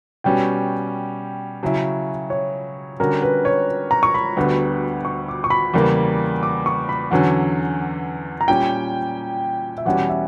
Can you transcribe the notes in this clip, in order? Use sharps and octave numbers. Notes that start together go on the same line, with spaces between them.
B2 G3 C#4 G5
C#3 F#3 C#4 E4
C#5
D3 G3 C#4 F#4 A#4
B4
C#5
A#5
C#6
B5
D2 D3 G3 B3 F#4
C#6
D6
C#6
B5
E2 C#3 G3 A#3
D6
C#6
B5
E2 D3 F#3 C#4 F#5
A#5
A#2 G3 C#4 G4 G5
E5
E2 B2 G3 C#4 G4 F#5
E5